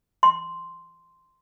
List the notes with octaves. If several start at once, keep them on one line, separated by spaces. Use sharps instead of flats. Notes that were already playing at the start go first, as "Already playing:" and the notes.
C6